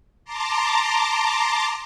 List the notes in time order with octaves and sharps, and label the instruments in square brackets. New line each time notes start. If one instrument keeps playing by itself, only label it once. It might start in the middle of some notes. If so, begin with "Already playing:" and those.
[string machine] A5 A#5 C6 D6